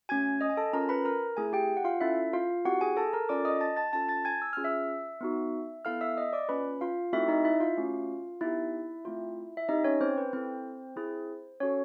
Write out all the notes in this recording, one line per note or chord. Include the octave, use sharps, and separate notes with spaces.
A3 C#4 F#4 G#5 G#6
D#5 D#6
G#5
A4 A5
C#4 F4 A4 A#4 A#5
B4 B5
A#4 A#5
A3 C4 E4 G#4 G#5
G4 G5
F#5
F4 F5
C#4 E4 A4 E5
F4 F5
C4 E4 F#4 G4 F#5
G#4 G#5
A4 A5
A#4 A#5
C#4 F4 A4 D5 D6
D#5 D#6
A5 A6
A5 A6
C#4 F4 A4 A5 A6
A5 A6
G#5 G#6
E6
C#4 F4 G#4 F6
E5 E6
B3 D#4 F#4
B3 E4 A4 F5 F6
E5 E6
D#5 D#6
D5 D6
A#3 C#4 F4 B4 B5
F4 F5
A3 C4 D#4 E4 F#4 A4 E5
D#4 D#5
E4 E5
F4 F5
A3 C#4 F#4
B3 D#4 E4 G4 E5
A3 C4 F4
E5
C4 D#4 G4 D#5
C#4 C#5
C4 C5
B4
C4 E4 A4 C5
C4 E4 G#4
C#4 F#4 A4 C#5